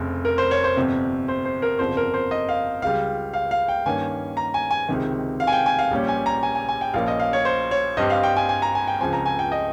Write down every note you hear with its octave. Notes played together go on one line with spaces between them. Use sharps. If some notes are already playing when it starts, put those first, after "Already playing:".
Already playing: F1 F2 C#3
A#4
C5
C#5
C5
G1 F2 C3
C5
C5
A#4
G1 F2 C#3 F3 C5
A#4
C5
D#5
F5
C#2 C#3 G3 F5
F5
F5
G5
G2 D#3 A#3 C#4 G#5
A#5
G#5
G#5
C#2 C3 D#3
F5
G#5
G5
G#5
F5
A#1 A#2 G3 C#4
G#5
A#5
G#5
G#5
G#5
G5
A#1 A#2 F3 A#3 C#4 F5
D#5
F5
C#5
C5
C#5
G2 G3 C4 D#5
F5
G5
G#5
G#5
A#5
G#5
G5
C#2 C#3 F3 C4 G#5
A#5
G#5
G5
D#5